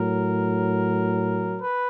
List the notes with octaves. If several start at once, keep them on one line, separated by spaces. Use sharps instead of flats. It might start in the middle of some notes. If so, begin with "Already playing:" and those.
Already playing: A2 F#3 A#4
B4